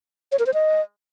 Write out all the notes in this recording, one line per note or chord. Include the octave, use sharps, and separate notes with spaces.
C#5
A#4
C5
D#5